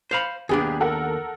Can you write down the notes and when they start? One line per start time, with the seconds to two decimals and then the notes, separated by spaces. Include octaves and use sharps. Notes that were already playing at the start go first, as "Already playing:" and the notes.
0.11 C5 F5 B5
0.49 D#2 B3 D4 G4 G#4
0.80 A4 A#4 F#5